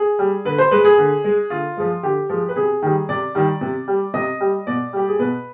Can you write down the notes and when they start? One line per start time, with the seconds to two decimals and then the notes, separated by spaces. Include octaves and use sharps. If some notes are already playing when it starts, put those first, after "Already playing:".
Already playing: G#4
0.19 G3
0.45 D3 B4
0.58 C5
0.71 G#3 B4
0.85 G#4
0.98 D3
1.24 G#3
1.50 D3 F4
1.77 F3 G#3
2.03 D3 G4
2.29 F3 G#3
2.49 B4
2.56 C3 G#4
2.82 D#3 G3
3.09 C3 D5
3.35 D#3 G3
3.61 C3
3.88 G3
4.14 C3 D#5
4.40 G3
4.67 B2 D5
4.93 G3 G4
5.08 G#4
5.19 B2 B4